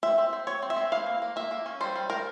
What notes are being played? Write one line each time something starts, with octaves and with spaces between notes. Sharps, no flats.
C4 E5
C4
C4
C4 C#5
C4
E5
C4
E3 F5
A#3
A#3
A#3 E5
A#3
C#4
G3 C5
G3
G3 A#4